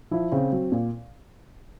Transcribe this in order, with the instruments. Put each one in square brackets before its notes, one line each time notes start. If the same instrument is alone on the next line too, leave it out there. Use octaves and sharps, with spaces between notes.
[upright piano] F3 E4
C#3 C4
F#3
A#2